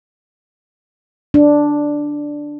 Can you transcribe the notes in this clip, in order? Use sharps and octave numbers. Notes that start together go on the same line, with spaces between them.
D4